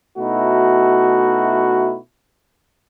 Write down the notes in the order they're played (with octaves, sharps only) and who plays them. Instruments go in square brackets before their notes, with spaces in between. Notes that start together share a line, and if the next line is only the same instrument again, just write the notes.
[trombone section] B2 A3 D#4 E4 F#4